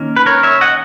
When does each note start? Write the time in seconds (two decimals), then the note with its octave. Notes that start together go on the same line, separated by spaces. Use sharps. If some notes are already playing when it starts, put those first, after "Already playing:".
Already playing: D#3 A#3 C#4
0.16 B4
0.26 A#4 C#5
0.43 C#5 E5
0.61 D#5 F#5